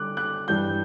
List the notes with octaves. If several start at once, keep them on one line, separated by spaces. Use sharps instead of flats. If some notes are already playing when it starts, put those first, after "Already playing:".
Already playing: D3 G3 D6 F#6
F#6
G2 E3 G3 G6